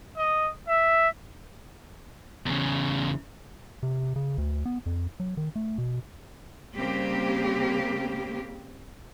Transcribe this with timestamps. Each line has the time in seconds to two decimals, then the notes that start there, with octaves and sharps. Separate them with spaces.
0.17 D#5
0.68 E5
2.46 E2 C#3
3.83 C3
4.16 C#3
4.38 D2
4.65 B3
4.86 F2
5.20 F#3
5.37 D#3
5.56 A3
5.78 B2
6.77 C#3 G3 A#3 C4 G4